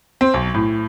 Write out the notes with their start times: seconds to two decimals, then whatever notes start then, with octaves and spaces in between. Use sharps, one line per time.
0.21 C4
0.34 B1
0.54 A2